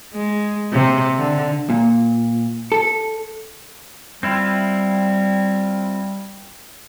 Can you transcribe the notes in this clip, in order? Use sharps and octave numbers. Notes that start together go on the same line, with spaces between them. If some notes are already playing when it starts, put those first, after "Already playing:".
G#3
C3
D3
A#2
A4
G3 C4 E4 F4